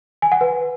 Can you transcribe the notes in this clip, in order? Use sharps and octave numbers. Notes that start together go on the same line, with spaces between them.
G#5
F#5
B4